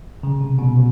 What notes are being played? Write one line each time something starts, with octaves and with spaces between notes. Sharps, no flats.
C#3
C3
B2
B2